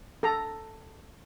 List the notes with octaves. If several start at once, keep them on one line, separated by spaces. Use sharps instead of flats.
A4 A#5